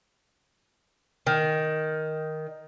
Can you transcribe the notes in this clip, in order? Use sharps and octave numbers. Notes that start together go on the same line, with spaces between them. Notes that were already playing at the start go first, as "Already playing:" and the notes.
D#3